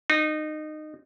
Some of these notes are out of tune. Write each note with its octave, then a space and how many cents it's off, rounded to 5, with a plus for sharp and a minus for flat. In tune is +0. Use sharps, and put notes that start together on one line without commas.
D#4 -20